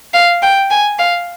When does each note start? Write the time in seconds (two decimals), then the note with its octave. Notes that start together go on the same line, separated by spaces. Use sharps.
0.14 F5
0.42 G5
0.70 G#5
0.98 F5